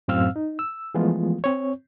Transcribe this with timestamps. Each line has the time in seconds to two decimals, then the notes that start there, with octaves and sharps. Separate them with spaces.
0.08 F#2 A2 C4 F5 E6 F6
0.36 D#4
0.59 E6
0.94 E3 F3 G#3 A3 B3 F4
1.44 C4 C#5